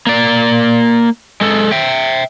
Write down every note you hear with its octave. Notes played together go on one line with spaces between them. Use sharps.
A#3 D5
G#3 A4
E5 G5